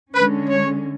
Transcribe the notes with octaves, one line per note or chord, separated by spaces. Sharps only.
D3 G#3 C#4 B4
C#5